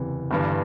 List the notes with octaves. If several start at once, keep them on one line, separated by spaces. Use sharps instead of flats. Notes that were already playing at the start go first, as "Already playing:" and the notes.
Already playing: F#1 E2 C3 E3
G1 G2 E3